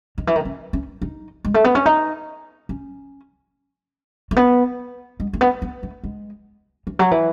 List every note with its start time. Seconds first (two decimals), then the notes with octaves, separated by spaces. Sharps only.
0.18 D#3
0.27 E3
0.36 D#3
0.45 C#4
0.73 C#4
1.02 D#4
1.45 G#3
1.54 A3
1.64 B3
1.75 C#4
1.86 D#4
2.69 C#4
4.31 A3
4.36 B3
5.20 G#3
5.33 A3
5.41 B3
5.62 B3
5.83 A3
6.04 G#3
6.87 E3
6.99 F#3
7.11 E3